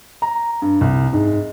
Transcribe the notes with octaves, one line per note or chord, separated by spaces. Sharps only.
A#5
G2
C2
G#2